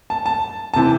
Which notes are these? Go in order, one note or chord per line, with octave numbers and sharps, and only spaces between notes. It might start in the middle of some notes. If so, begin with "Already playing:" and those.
A5
A5
A5
C3 E3